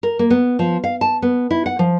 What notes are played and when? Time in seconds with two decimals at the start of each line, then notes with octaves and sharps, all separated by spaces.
0.03 A#4
0.19 A#3
0.30 B3
0.59 F3
0.84 F5
1.01 A5
1.22 B3
1.51 E4
1.66 F#5
1.79 F3